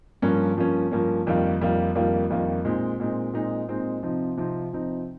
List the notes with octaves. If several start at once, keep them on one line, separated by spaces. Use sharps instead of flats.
G2 F3 A#3 C#4
G2 F3 A#3 C#4
G2 F3 A#3 C#4
F2 D#3 G3 A#3 F4
F2 D#3 G3 A#3 F4
F2 D#3 G3 A#3 F4
F2 D#3 G3 A#3 F4
A#2 G#3 C4 D#4
A#2 G#3 C4 D#4
A#2 G#3 C4 D#4
A#2 G#3 C4 D#4
C3 F3 C4 D#4
C3 F3 C4 D#4
C3 F3 C4 D#4